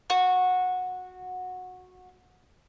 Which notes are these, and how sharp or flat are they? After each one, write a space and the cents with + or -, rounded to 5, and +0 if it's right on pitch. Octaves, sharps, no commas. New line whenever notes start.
F#4 -15